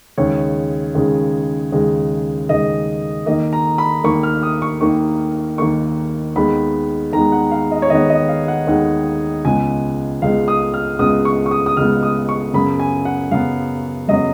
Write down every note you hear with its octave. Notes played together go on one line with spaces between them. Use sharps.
D#2 C#3 G#3 C#5
D#2 C#3 G#3
D#2 C#3 G#3
D#2 C#3 G#3 D#5
D#2 D#3 A#3 D#5
A#5
B5
D#2 D#3 A#3 C#6
F6
D#6
C#6
D#2 D#3 A#3 C#6
D#2 D#3 A#3 C#6
D#2 D#3 G#3 B3 B5
D#2 D#3 G#3 B3 A#5
F#5
F5
D#5
C#5
D#2 D#3 G#3 B3 D#5
D#5
F5
F#5
D#2 D#3 G#3 B3 F#5
C#2 C#3 G#3 B3 G#5
C#2 C#3 G#3 B3 F5
D#6
F6
C#2 C#3 G#3 B3 D#6
C#6
C#6
D#6
D#6
C#2 C#3 G#3 B3 F6
D#6
C#6
F#2 C#3 F#3 B3 B5
G#5
F#5
F#2 C#3 F#3 B3 F5
F#2 C#3 F#3 B3 D#5